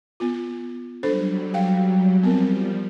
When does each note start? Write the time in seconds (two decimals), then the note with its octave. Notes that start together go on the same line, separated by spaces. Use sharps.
0.20 B3 F4
1.03 F#3 G3 D4 A4 C5
1.54 F5 G5
2.23 F3 G3 B3 C4 A#4